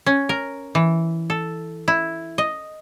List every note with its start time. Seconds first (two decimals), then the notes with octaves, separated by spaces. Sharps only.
0.06 C#4
0.29 A#4
0.75 E3
1.30 A4
1.88 E4
2.38 D#5